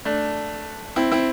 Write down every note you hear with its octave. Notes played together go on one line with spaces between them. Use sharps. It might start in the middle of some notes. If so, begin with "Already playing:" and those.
A3 D4
C4 E4
C4 E4